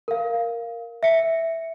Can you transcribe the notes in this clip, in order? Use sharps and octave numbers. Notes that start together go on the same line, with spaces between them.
A#4 F5
E5 C#7